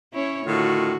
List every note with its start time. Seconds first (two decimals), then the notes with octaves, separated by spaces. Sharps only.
0.13 C#4 E4 C#5
0.46 A2 D3 D#3 F4 F#4